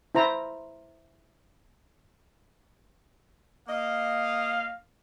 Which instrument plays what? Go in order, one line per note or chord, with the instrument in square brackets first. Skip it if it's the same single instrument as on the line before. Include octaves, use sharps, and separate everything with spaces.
[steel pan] E4 C5 A#5
[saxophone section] A#3 D#5 [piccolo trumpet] F5